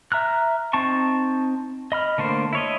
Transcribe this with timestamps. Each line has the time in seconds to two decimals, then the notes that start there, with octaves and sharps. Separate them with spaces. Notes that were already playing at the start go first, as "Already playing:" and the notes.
0.12 E5 A#5 F6 F#6
0.73 C4 D#4 A5 C#6
1.92 D#5 B5 F6
2.18 D3 A3 A#3 C5
2.53 E4 C#5 D#5